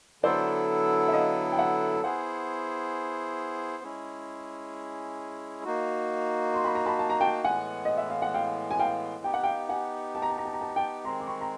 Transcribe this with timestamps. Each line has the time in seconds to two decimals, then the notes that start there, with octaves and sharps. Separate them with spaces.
0.23 D3 F#3 B3 E4 A4 C5 D5
1.08 E5
1.13 D#5 F5
1.52 G5
1.59 E5 F#5
1.95 A5
2.03 B3 E4 G#4 C5 F#5 G#5
3.83 G#3 C#4 E4 G#4
5.64 A#3 D#4 F#4
6.54 C6
6.65 B5
6.75 A#5
6.86 A5 B5
6.99 A5
7.10 A#5
7.21 G5 A5
7.44 A2 E3 G#3 B3 F#5 G#5
7.85 D#5
7.97 E5
8.10 F5
8.22 F#5
8.34 F5 G5
8.71 G#5
8.79 F5 G5
9.24 B3 D#4 G4 G5
9.34 F#5
9.43 F5 G5
9.69 F#5 G#5
10.15 A5
10.22 A#5
10.30 A5
10.38 A#5
10.46 A5
10.53 A#5
10.61 A5
10.69 A#5
10.76 G5 A5
11.05 D#3 G#3 C4 A#5 C6
11.20 D6
11.27 B5 C#6
11.41 A#5